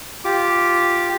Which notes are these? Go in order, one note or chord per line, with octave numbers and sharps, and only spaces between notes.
F4 G4 D6